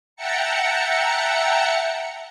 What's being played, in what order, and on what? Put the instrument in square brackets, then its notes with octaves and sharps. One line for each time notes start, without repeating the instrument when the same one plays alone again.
[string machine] E5 F#5 G5 A5 A#5 C#7